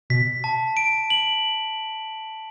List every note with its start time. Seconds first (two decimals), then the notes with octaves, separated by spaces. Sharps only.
0.10 B2 B6
0.44 A5
0.77 D7
1.10 F#7